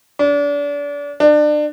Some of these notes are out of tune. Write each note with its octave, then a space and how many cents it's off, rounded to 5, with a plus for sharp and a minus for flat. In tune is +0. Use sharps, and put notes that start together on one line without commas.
D4 -30
D4 +30